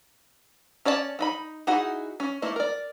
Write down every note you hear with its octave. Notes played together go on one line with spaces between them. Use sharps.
C#4 C#5 D5 F5 A5
D4 D#4 B5
D#4 E4 F#4 G#4 F#5
C#4
A3 A#3 E4
A#4 D5